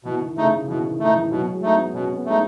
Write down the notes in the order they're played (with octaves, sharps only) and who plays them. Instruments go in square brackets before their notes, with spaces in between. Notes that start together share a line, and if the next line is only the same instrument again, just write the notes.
[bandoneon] B2 [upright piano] E3
[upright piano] D#3
D#3
[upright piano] C#3 [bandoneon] A3 D#4
[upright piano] D#3
[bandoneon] B2 [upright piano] E3
[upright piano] D#3
[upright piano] D#3 [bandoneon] A3 D#4
[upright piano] E3
[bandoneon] B2 [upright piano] F#3
[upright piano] G#3
[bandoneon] A3 D#4
[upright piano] B3
[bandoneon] B2 [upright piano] C#4
[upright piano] B3
[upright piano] G#3 [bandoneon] A3 D#4